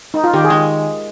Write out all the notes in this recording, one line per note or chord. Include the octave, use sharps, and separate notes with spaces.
D#4
F4
D#3 G4
G#4
G#3